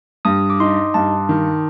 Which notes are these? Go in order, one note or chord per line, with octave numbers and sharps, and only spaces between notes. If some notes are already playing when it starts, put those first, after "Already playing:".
G2 D#6
D6
D#4 C6
G2 A5
D#3